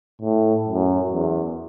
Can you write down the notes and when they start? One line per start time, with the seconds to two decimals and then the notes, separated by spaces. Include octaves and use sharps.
0.22 A2
0.68 F#2
1.13 E2